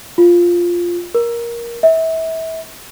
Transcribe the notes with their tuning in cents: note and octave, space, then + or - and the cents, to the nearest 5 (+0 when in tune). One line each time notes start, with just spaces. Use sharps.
F4 +0
A#4 +10
E5 -30